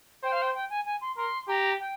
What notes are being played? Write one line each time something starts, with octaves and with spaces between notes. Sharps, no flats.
C5 G5
F5
G5
G5
G#5
G#5
C6
A#4 C6
G4 A#5
G5